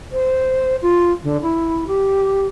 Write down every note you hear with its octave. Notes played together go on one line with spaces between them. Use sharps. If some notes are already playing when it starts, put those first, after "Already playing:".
C5
F4
D3
E4
G4